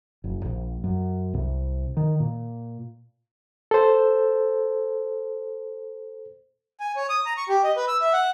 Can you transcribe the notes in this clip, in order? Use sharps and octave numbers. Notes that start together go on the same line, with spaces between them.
F#1
A#1
F#2
C2
D#3
A#2
A4 C5
G#5
C#5
D#6
A#5
C#6
G4
D#5
B4
E6
E5
F#5